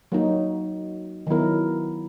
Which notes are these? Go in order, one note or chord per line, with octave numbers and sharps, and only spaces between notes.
F#3 A#3 D#4 F#4
D#3 F#3 B3 E4 A#4